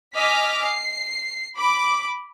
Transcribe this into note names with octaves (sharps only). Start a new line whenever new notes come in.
D#5 G#5 D6 F6 B6
C7
B5 D6